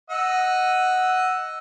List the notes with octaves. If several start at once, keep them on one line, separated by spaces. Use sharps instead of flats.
D#5 F#5 E6